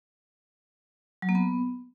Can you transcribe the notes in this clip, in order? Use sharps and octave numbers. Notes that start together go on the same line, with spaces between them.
F#3
A#3
B3